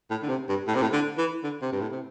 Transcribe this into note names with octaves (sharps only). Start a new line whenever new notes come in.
A2
D3
C3
G2
A2
C3
A2
D3
E3
D3
C3
G2
A2
C3